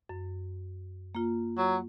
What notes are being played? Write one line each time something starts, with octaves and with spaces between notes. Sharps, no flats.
F#2
A#3 F4
F#3